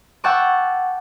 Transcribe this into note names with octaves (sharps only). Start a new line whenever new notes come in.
E5 F#5 G5 A5 C#6 D6